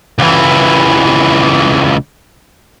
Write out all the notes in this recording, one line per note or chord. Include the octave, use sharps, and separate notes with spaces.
C#2 E3